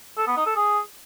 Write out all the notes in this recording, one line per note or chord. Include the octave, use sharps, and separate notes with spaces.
A4
B3
D#4
A4
G#4